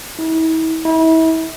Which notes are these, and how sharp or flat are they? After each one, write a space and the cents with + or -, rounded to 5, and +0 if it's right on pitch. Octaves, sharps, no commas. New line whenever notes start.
E4 -40
E4 -35